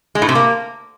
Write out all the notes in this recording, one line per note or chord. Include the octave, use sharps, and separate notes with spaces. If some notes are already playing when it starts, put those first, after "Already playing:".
G#3
A2
C3
A#3